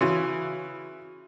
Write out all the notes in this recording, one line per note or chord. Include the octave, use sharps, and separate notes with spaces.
C#3 E3 F#4